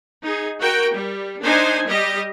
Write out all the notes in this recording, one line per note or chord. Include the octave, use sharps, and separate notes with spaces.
D#4 G#4
F#4 A#4 G5
G3
D4 D#4 C5 G#5
G3 G4 D#5